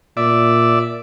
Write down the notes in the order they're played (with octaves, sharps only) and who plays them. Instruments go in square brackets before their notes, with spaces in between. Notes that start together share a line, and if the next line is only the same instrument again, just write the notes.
[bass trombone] A#2 [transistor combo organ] D5 E5